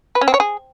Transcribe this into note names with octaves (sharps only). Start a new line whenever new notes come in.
B4
C#4
C4
C#5
G#4